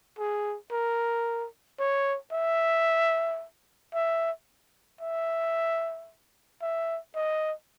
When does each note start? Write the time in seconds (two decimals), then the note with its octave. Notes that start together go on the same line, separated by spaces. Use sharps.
0.19 G#4
0.72 A#4
1.79 C#5
2.33 E5
3.94 E5
5.01 E5
6.61 E5
7.15 D#5